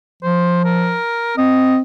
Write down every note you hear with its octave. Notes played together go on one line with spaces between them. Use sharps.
F3 C5
A#4
C4 D#5